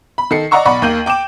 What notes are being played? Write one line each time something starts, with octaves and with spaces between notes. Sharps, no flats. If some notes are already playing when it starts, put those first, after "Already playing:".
B5
D#3 A4 C7 C#7
D5 D#5 F#5 A#5 C#6 E6
B1 D5 F#5 B5 C#6
D#2 A#3 G6 D#7 F#7
G5 D6 D7 E7